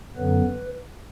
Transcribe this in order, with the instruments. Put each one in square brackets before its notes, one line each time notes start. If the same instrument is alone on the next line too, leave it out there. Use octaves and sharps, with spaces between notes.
[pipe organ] F#2 D3 F#3 B3 B4